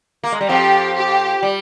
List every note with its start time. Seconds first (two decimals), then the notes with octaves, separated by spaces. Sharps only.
0.24 A#3
0.32 G#3
0.41 G3
0.49 F2 F3 G4
0.96 G4
1.43 G3